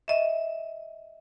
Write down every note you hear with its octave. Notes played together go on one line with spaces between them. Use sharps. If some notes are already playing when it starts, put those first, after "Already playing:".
D#5 E5